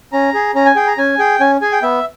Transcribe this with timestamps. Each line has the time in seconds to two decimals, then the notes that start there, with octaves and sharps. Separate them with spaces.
0.13 C#4 A#5
0.34 G#4
0.55 C#4 A#5
0.66 G#5
0.76 G#4 G5
0.88 A#5
0.98 C#4 G#5
1.19 G#4 G5
1.40 C#4 G#5
1.61 G#4 G#5
1.72 G5
1.82 B3 E5